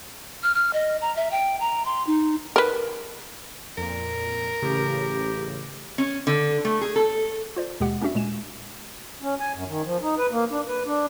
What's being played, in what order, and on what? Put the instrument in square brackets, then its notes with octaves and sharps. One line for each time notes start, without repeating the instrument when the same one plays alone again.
[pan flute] F6
F6
D#5
A#5
E5
G5
A#5
C6
D#4
[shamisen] A#4 B4
[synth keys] F2 A#2 [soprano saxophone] A#4
[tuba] A1 [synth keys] C#3 [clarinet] G4
[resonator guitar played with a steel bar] C#4
D3
A3
G#4
A4
[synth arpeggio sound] F4 C5 D5
D#2 B2 G#3 G4 F#5
A#3 C#4 D4 F#4 E5
A#2 G#3 G#5 E7
[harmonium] C#4
G#5
F#2
D#3
F3
D#4
B4
A#3
D4
B4
D4